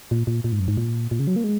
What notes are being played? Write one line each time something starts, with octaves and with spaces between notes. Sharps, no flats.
A#2
A#2
A#2
G#2
F#2
G#2
A#2
A#2
C#3
F#3
A#3
G#3